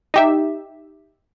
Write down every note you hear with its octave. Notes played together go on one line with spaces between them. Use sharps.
D#4 G4 E5